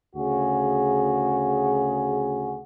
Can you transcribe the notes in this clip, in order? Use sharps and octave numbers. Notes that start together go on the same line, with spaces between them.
D2 C#3 F#4 G#4